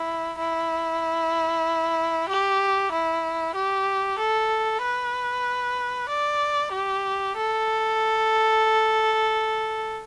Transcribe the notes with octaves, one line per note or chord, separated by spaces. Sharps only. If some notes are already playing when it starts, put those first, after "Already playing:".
Already playing: E4
E4
G4
E4
G4
A4
B4
D5
G4
A4